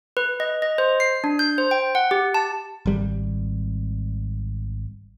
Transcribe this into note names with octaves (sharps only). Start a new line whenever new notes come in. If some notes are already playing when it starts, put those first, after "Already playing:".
B4
D#5
D#5
C5
C7
D4
G6
C5
G5
F#5
G4
A5
G#1 G3